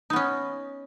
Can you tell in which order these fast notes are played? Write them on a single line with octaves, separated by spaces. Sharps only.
D#4 B3 C#4